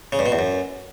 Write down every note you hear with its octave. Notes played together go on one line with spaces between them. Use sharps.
C#3
G2
B2
E2
F#2